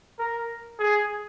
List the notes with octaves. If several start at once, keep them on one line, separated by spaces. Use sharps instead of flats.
A#4
G#4